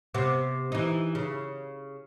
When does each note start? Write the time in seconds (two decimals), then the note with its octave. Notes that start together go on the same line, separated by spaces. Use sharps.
0.14 C3 B3
0.72 E3 D#4
1.15 C#3